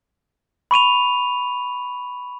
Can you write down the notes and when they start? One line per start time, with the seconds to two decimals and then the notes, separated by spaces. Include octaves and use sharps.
0.71 B5 C#6 D#7 F7